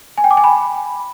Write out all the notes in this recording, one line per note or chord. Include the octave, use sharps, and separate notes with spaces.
G#5
G5
D6
G#5
B5